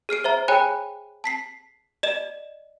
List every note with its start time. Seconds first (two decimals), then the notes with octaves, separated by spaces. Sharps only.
0.09 G#4 F6 C7 D7
0.24 C5 E5 A#5
0.48 G#4 C#5 G5 G#5 B5 F#6
1.24 A5 B6 C7
2.03 D5 D#5 E7